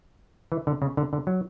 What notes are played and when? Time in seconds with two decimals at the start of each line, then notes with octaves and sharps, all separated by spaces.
0.52 E3
0.67 D3
0.82 C#3
0.97 D3
1.13 D3
1.27 F#3